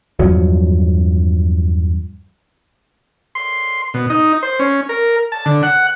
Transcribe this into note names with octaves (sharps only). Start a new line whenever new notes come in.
E2 G2 F3 F#3
C6
B2
D#4
C5
C#4
A#4
A5
D3
F#5